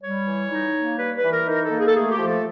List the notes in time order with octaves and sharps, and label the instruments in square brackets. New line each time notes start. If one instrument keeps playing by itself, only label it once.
[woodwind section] G3 C#5
E3
D#4
A#3
G3 B4
B4
E3
A#4
D#4 A#4
A4
A#3
G#4
A4
A3 G#4
G4
F3
A4